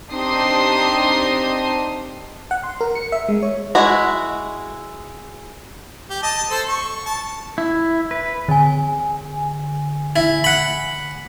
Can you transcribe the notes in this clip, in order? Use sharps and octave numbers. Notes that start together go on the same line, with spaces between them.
C4 D4 D#4 G4 C6 D#6
F#5
C6
A#4
C#7
E5
G#3
C#5
G#3 E4 F#4
G4
D#5 A5
A4 C5
C#6
A5
E4
B4
D3 G#5
E4
F#5 B5